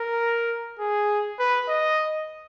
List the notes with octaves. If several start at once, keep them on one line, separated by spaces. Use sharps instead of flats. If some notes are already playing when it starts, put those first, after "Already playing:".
Already playing: A#4
G#4
B4
D#5